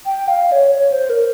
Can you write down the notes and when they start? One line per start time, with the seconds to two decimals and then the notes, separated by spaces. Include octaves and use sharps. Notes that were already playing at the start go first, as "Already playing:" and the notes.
0.06 G5
0.28 F5
0.52 C#5
0.75 C#5
0.92 C5
1.10 A#4